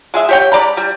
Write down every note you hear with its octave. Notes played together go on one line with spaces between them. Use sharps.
G#3 G#4 E5
G4 C#5 G5
G#3 D5 A#5 B5
G3